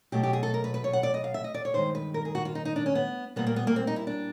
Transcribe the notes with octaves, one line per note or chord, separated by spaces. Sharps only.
B2 F#3 A3 G4
G4
G#4
A4
A#4
B4
B4
C#5
F#5
D5
D#5
F5
E5
D#5
D5
C#5
G2 D#3 G#3 C5
B4
A#4
G#4
F#4
F4
D#4
D#4
D4
C#4
B3
A#2 G3 A#3 B3
A#3
B3
A#3
C4
D#4
E4
D4